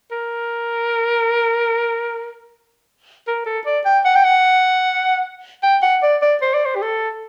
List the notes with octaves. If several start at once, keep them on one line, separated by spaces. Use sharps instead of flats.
A#4
A#4
A4
D5
G5
F#5
G5
F#5
G5
F#5
D5
D5
C5
D5
C5
G4
A4